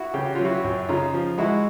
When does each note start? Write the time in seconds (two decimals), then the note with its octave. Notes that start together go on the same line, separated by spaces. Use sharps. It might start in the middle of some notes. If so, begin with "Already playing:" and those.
Already playing: E4 F#4
0.14 C#3 G4
0.25 F#4
0.35 F#3 F4
0.45 E4 F#4
0.64 F#2
0.89 C#3 D#4 F4
1.14 F3
1.38 G#3 E4 F#4